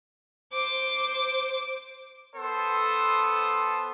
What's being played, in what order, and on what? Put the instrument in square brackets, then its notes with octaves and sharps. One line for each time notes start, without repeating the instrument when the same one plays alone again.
[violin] C5 D6
[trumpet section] B3 A4 C5